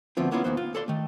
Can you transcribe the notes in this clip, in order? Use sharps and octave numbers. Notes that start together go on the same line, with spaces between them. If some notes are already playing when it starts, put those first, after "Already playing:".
D2 F3 B3 C4 F4
A#3 B3 C#4 E4 F4
D#2 G#2 D#3 B3 C5
F4
A4 D5 C6
D#3 A3